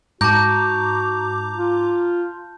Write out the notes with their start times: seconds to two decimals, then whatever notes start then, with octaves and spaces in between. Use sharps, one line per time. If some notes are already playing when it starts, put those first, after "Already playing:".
0.21 G#2 F#4 A5 A#5 D6 G6
1.55 F4